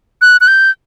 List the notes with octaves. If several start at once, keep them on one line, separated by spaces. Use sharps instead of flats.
F#6
F#6
G6